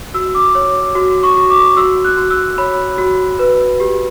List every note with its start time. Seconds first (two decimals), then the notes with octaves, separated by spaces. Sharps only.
0.14 F#4 E6
0.35 D6
0.55 C#5
0.95 F#4
1.23 C#6
1.37 F#4
1.50 D6
1.77 F#4 E6
2.04 F#6
2.17 F#4
2.30 E6
2.58 C#5 B5
2.98 F#4
3.39 B4
3.80 G4